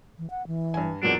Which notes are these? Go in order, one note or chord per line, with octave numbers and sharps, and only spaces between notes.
E3
F#5
E3
G2 G#5
E2 A#2 F#3 D4 F4